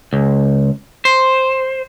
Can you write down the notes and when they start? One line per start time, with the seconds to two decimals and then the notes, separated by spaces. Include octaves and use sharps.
0.13 C#2
1.05 C5